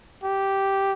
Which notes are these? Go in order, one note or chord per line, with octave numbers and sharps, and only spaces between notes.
G4